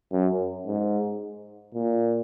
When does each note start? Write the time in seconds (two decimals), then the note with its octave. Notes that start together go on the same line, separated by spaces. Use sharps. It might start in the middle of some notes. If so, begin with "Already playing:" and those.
0.12 F#2
0.66 G#2
1.74 A#2